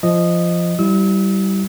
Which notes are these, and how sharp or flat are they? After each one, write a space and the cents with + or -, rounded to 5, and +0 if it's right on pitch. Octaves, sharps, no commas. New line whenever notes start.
F3 -15 D#5 -10
G3 -20 E4 +0 E6 -40